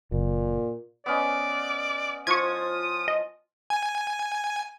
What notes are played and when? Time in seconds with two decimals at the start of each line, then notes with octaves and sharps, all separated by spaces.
0.12 F#1 A#2
1.06 B3 C#4 D5 D#5
2.27 F3 F4 C#6 D#6 G#6
3.08 D#5
3.70 G#5